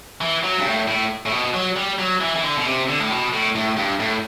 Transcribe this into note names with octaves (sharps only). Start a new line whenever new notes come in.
E3
F#3
G2
A2
A2
A2
B2
F#3
G3
F#3
E3
E3
D3
B2
C3
D3
A2
B2
A2
A2
G2
A2